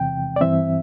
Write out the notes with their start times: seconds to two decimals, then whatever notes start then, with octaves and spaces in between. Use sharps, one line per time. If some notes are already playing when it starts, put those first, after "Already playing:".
Already playing: E2 C3 E3 C4 G5
0.36 D5
0.41 G2 E3 C4 E5